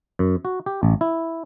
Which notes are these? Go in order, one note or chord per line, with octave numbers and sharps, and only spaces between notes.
F#2
F#4
G4
A1
E4